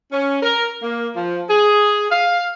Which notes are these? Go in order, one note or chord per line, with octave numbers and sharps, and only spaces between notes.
C#4
A#4
A#3
F3
G#4
F5